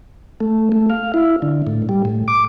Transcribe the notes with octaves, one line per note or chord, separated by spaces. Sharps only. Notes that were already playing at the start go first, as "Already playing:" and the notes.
A3
A3
F5
E4
D3
A2
G3
A2
D6